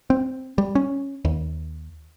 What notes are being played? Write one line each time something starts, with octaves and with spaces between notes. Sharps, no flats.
C4
G3
C#4
D#2